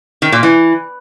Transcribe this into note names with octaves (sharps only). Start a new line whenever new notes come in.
D#3
A#2
E3